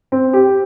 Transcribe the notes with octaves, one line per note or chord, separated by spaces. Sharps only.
C4
G4